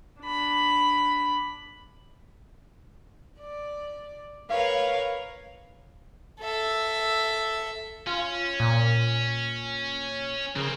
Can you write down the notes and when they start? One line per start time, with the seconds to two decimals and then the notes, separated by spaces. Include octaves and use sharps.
0.21 D4 B5
3.40 D5
4.50 A#4 B4 C#5 F5
6.41 A4 E5
8.07 C#4 F4
8.60 A#2
10.56 C#3 A#3 C4